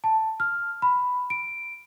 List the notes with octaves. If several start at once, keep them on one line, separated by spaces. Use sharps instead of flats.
A5
F6
B5
D7